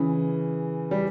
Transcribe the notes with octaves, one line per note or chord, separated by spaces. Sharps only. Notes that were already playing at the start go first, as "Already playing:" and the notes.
Already playing: C#3 E3
G3